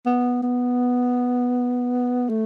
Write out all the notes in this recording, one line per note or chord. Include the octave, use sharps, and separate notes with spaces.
B3
B3
A3